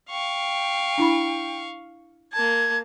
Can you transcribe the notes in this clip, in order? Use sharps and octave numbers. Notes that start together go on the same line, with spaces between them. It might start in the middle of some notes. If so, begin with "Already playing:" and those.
F5 G5 C#6
D4 E4 B5
A#3 A5 G#6